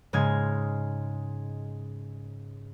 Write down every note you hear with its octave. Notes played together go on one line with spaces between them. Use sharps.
G#2 C#3 G#3 F6 G#6